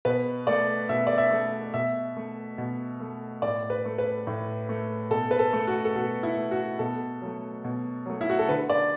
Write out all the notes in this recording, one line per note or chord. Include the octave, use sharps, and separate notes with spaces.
B2 B4
A3 D5
B2 E5
D5
E5
A3
B2 E5
A3
B2
A3
A2 D5
B4
A3
B4
A2
A3
B2 A4
B4
A4
A3
F#4
A4
B2 F#4
E4
A3
F#4
B2 A4
F#3 A3
B2
F#3 A3
E4
F#4
A4
D3 B4
D5